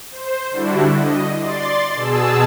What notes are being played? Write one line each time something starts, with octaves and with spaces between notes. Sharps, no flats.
C5
D3 G3 D4 E4 F#4
D#5
D5 C6 A6
B2 G#4 A5 E6